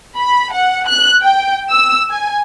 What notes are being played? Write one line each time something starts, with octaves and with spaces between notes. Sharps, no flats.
B5
F#5
F#6
G5
E6
G#5